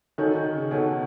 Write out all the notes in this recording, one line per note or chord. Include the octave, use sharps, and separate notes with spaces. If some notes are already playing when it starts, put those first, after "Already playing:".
D#3 D#4 F#4 A4 C#5 G#5
D#3
C#3
B2 D#4 F#4 A4 C#5 G#5